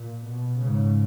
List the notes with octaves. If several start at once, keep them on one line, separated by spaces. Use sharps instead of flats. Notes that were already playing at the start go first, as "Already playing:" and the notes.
Already playing: A#2
B2
G#2 C#3